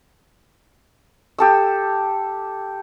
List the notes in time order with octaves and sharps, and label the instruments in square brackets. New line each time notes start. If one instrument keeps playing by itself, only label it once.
[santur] G4 A4 E6